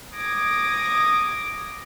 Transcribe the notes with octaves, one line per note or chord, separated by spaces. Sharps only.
D6 D#6 G#6 A#6